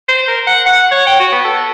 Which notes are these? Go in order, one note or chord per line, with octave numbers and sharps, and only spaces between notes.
C5
A#4
F#5
F#5
C#5
G5
F#4
B3
A4